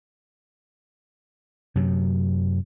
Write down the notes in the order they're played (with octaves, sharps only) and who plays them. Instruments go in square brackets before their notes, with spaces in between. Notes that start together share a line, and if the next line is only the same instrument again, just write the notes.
[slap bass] F#2 C3 F#3